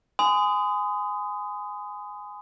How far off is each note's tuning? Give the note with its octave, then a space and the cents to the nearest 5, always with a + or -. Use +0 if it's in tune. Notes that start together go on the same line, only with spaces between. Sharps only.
G#5 +0 C6 -45 D#6 +0